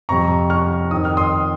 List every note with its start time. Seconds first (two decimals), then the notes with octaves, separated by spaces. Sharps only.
0.09 F2 C3 F3 A#5 C#6
0.50 C#6 F6
0.91 F2 D#3 D#6
1.05 F6
1.17 C6 D#6